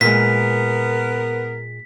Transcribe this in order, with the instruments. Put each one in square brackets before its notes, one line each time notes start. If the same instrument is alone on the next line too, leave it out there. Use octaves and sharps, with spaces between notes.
[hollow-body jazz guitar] A#2 G#3 [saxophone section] B3 A#4 [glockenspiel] B6